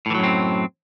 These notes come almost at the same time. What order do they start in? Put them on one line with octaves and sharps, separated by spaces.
A2 E3 F#3 F#2 C4